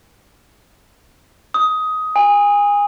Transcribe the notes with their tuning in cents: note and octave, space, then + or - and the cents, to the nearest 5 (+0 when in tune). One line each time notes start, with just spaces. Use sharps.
D#6 +15
G#5 -25